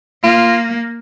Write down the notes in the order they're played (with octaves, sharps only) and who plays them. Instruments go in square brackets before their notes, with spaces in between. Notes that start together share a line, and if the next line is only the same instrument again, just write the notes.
[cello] A#3 [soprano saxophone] F4